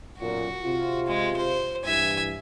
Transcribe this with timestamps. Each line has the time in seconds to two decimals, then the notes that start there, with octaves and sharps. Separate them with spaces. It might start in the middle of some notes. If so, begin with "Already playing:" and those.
0.20 B1 F#2 A#2 F#4
0.64 C3 F4
1.07 G#3
1.36 C5
1.85 G2 E3 E5 G#5